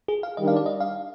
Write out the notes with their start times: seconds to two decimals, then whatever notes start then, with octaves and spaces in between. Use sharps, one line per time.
0.08 G#4
0.23 F5
0.37 D#3 G3 D4 D#5
0.48 F5
0.57 D5
0.66 D#5
0.80 F5